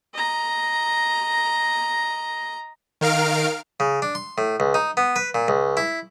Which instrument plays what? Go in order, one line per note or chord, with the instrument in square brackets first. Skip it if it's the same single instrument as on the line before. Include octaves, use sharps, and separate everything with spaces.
[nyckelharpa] D#5 A#5
[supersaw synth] D#3 A#4 F5 F6 D7
[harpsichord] C#3
D4
C6
A2
C#2
D#4
B3
B4
A#2
C#2
E4